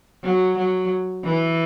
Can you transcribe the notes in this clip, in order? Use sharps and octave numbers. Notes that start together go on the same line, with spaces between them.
F#3
F#3
E3